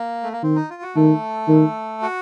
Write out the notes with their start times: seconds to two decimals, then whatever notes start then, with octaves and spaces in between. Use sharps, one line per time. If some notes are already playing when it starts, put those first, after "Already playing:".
Already playing: A#3
0.23 A3
0.33 A#3
0.43 D#3 C4
0.56 D#4
0.70 F4
0.82 F#4
0.95 D#3 A3 A4
1.48 D#3
2.02 F#4